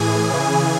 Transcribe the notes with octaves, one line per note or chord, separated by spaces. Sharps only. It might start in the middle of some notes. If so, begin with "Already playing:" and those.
Already playing: A2 E3 G#4 G#5
C#3 E3